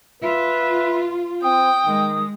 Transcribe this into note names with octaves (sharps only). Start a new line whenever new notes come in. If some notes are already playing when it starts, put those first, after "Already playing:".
F4 B4 E5
C4 G5 D#6
D#3 G#3